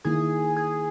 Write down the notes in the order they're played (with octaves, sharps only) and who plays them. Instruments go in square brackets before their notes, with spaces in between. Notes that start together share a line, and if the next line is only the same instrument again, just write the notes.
[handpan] D#3 A#3 E4 [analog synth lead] G#4
[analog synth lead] G#4